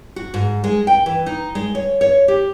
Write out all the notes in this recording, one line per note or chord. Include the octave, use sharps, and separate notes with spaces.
F#4
G#2
G#3
G5
E3
D#4
G#3
C#5
C#5
G4